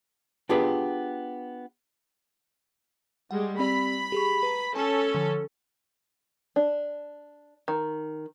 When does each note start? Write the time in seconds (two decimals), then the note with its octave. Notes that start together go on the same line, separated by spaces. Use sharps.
0.49 B3 D4 F4 G4 G#4 B4
3.31 G3 G#3 F#5
3.59 C4 G4 D5 B5
4.12 G4 G#4 C#6
4.43 B4 A#5
4.75 C#4 A4 G#5 A5
5.15 D3 F3
6.56 D4
7.68 D#3